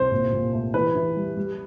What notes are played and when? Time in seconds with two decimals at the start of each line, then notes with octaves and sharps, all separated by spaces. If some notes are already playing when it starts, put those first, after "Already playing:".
Already playing: C2 C5
0.12 A#2
0.33 A#2
0.53 A3
0.74 E3 B4
0.95 E3
1.16 G3
1.37 G3